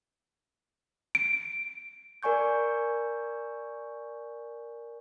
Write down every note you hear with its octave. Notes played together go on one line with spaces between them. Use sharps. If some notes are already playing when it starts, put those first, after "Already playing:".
D7
A#4 D5 G#5 C#6 G6